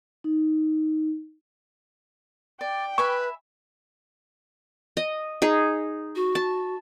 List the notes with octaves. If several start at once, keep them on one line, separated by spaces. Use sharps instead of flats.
D#4
D5 G5
B4 E5 G#5 B5 C#6
D#5
D#4 G#4
F#4
A5